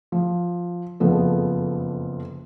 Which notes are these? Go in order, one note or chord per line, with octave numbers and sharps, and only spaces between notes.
F3
F#1 F2 F3 B3 A4